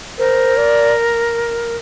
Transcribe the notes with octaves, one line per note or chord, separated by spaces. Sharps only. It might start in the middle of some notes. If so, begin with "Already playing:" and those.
A#4 C5
D5